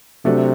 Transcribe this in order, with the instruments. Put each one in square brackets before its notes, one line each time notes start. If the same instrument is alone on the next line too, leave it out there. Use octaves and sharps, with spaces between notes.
[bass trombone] C3 [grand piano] F#3 A3 D4 F#4 A4